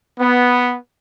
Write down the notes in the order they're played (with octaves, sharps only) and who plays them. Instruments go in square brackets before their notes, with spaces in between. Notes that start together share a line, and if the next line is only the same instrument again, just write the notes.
[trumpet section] B3